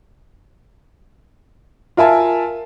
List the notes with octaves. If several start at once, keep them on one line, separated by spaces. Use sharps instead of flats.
F4 A#4 E5 F5 G#5 A5